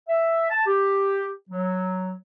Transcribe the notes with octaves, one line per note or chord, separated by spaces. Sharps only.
E5
A5
G4
F#3